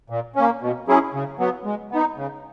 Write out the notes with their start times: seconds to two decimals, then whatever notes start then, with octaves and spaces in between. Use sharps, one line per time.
0.10 A#2
0.36 A#3 C#4
0.61 B2
0.88 F#3 C#4 E4 G#4
1.14 C#3
1.39 F#3 B3
1.65 G#3
1.92 B3 D#4
2.17 C#3